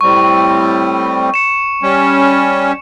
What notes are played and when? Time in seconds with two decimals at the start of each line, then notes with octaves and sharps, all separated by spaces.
0.01 A2 G3 C4 C#6
1.34 C#7 E7
1.83 G3 C#4